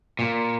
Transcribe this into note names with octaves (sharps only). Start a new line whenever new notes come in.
A#2